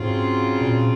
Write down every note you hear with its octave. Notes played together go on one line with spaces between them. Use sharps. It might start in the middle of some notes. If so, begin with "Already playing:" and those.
Already playing: G#2 C#3 F#3 C4 F4
A#2